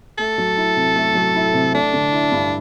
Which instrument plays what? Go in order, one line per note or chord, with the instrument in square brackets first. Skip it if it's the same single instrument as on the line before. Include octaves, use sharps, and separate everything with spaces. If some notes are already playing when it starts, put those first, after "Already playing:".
[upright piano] A3 [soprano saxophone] A4
[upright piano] F#3
E4
C3
A3
F#3
E4
C3
[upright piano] A3 [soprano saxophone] D4
[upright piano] D3
E4
G2